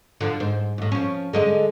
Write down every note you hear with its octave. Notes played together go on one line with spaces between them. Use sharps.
D3 F3 D4
G#2 C5
D#2 A2
F3 C#4
D3 G#3 D#5